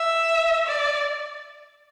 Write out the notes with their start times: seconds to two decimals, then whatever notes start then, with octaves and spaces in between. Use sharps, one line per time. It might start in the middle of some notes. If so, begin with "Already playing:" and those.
Already playing: E5
0.66 D5